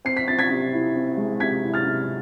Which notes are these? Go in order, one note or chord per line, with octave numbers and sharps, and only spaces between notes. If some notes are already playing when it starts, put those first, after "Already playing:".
C4 C7
B6
C4 A6
G#6 B6
C3
E4
C4
G#3
C3 G#6 B6
E4
F6 A6
C3